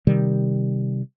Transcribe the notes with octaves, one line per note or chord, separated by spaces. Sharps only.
C3 D#3 G3